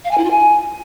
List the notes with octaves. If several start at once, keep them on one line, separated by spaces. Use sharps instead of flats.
F5
G#5
E4
F4
G#5